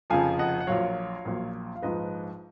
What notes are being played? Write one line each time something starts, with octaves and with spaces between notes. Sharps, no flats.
F1 F2 C#3 F3 F5 G#5
D#5 F#5
F#5
A#1 A#2 F#3 C#5 F5
A#1 A#2 F#3
F5
A#1 G#2 F3 B4 D#5